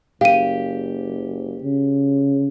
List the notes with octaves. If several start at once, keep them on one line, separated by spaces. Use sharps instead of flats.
F#1 G4 F5 D#7
C#3